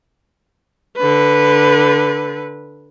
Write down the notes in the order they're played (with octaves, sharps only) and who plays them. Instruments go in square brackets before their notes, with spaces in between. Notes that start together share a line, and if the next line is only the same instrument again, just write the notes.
[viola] D3 B4